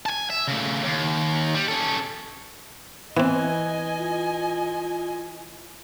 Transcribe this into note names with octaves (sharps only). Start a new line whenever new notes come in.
G#5 A5
E5
C#3 A3
D#2
G3
C#4 A4
E3 B3 C4 D#5 G#5
F4